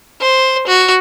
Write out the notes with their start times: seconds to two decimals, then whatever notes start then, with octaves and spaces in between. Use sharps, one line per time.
0.21 C5
0.67 F#4